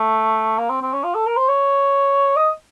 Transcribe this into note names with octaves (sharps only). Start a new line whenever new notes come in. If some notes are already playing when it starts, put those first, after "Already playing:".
Already playing: A3
A#3
C4
C4
C#4
F4
A4
A#4
C5
C#5
D#5